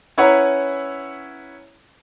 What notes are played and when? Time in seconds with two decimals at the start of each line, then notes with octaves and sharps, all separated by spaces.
0.18 C#4 E4 B4 C#5 F#5 A#5